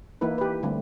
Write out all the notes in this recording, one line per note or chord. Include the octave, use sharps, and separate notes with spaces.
E3 A#3 D#4 E4 B4
G4 B4
D3 G3 A3 C4